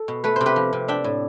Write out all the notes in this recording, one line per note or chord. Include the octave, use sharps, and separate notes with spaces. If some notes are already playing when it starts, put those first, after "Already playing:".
Already playing: A4
B2
A3 B4
C3 C5
G4 B4
F3
C3
D4 E5 G5
A2